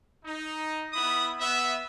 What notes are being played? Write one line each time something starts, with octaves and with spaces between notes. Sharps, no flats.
D#4
B3 E4 B5 D#6
B3 E5